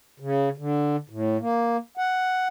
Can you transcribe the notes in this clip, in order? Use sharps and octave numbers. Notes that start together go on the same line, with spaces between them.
C#3
D3
A2
A#3
F#5